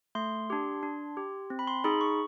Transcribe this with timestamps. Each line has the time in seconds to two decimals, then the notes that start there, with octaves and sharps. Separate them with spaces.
0.15 A3 C6
0.50 D4 G4
0.83 D4
1.17 G4
1.50 C4
1.59 B5
1.67 C6
1.84 D#4 G#4 B5
2.01 C#6